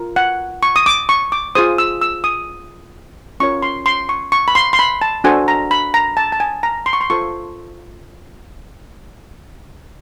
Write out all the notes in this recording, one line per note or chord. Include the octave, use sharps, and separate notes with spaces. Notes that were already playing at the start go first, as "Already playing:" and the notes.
Already playing: F4 A#4
F#5
C#6
D#6
D6
C#6
D6
F4 G#4 C5 D#6
E6
E6
D#6
C#4 F4 A#4 C#5 C#6
C6
C6
C#6
C#6
B5
C6
C6
B5
A5
D4 F#4 A4 C5 G#5
A#5
B5
A#5
A5
A5
G#5
A#5
C6
C#6
C6
F4 A4 C5 C#6